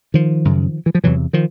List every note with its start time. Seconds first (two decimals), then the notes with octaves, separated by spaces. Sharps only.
0.14 D#3 F3
0.45 F#2 C#3
0.86 E3
0.95 F3
1.04 E2 C3 E3 F#3
1.33 D#3 F3